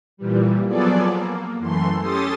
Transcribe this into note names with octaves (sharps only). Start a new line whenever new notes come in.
A#2 E3 G3
F3 F#3 B3 G#4 A4 D5
A#3
F#2 E3 A3 C6
C#4 G4 A4 C6 D#6 A6